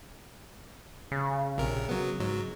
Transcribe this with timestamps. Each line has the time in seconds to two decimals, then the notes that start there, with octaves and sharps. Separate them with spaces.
1.12 C#3
1.58 A#1 C3 A#4
1.89 F#3 B3
2.20 G#2 F#3